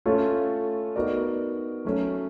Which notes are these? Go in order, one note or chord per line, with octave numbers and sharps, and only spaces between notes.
A3 C#4 F4 A4 C#5
B3 D#4 F#4 A#4 D5
F#3 A3 C#4